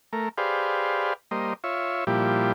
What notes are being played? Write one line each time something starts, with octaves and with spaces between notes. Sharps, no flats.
A3 A#4
G4 G#4 B4 C5 D5 F5
G3 A#3 C5 D#5
F4 C#5 E5
A#2 F3 G3 E4 G4